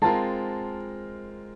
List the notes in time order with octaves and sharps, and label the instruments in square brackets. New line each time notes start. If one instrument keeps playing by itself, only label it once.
[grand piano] G#3 C4 F4 A#4 [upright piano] A5